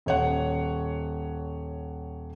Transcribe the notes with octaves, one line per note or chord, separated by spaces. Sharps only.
D#1 C#5 F#5